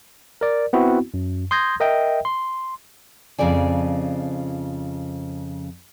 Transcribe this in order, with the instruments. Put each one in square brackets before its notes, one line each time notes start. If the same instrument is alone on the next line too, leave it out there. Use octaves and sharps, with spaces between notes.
[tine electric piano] A#4 D5
B3 C4 E4 F#4
F#2
C6 D#6 G6 G#6 A#6
A#4 D#5 E5 G5
C6
[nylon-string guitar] F2 C#3 F3 D5 G#5